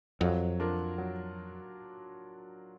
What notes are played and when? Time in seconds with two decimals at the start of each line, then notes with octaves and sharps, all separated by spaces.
0.21 F2 F#3
0.60 D4 F4 A#4
0.98 F#3